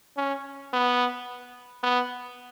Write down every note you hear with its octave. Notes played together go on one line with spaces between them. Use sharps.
C#4
B3
B3